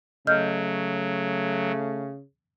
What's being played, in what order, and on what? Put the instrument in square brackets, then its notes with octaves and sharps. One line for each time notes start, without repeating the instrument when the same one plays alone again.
[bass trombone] C#3 [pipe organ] F#3 [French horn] A3 [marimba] D#5 F6 G6